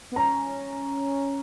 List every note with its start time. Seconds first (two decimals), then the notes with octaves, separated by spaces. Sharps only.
0.12 B3
0.16 C#4 A#5